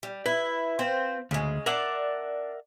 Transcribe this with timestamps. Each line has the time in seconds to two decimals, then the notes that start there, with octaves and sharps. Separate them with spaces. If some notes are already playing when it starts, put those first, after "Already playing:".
0.03 G3
0.26 E4 B4
0.79 C4 F4 C5
1.31 D2 C#3 G#3
1.66 D4 A#4 D5 E5 F#5